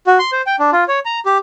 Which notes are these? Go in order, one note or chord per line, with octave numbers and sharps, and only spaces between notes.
F#4
C6
C5
G5
D4
F4
C#5
A#5
G4